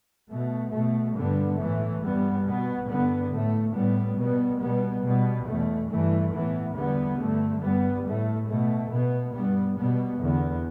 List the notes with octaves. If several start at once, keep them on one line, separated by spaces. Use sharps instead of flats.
B2 A3
B2 A3
G2 D3 G3 B3
A2 E3 A3
G2 G3 B3
B2
B3
G2 D3 B3
A2 A3
A2 G3 B3
B2 G3 B3
B2 G3 B3
B2 G3 B3
E2 B2 A3
G2 E3 A3
A2 E3 B3
E2 D3 G3 B3
G2 D3 A3
G2 G3 B3
A2 A3
B2 A3
B2 B3
G2 G3 B3
B2 G3 B3
E2 D3 B3